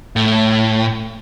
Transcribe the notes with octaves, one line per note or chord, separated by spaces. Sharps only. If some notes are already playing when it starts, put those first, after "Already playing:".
A2